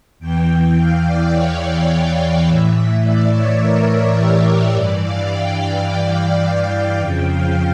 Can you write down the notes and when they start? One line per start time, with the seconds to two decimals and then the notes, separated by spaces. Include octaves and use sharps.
0.19 E2 E3 G5
0.76 F5
1.05 D5
1.32 C#5
1.90 F5
2.46 A2 E3 E5
3.03 D5
3.31 C#5
3.59 A#4
4.16 G4
4.72 G2 E3 D5
5.01 F5
5.29 G5
5.86 F5
6.98 F2 C#3 F3 G5
7.27 F5